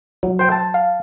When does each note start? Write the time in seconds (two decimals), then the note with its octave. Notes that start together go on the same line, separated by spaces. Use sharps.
0.23 F#3
0.39 C5 G5
0.52 A5
0.74 F5